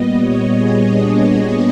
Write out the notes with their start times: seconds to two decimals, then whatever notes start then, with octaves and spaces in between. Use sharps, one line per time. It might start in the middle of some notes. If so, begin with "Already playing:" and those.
Already playing: A#2 G3 B3 D#5
0.21 C#5
0.53 G#4
0.85 D4